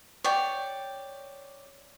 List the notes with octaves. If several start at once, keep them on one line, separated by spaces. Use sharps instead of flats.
C#5 D5 G5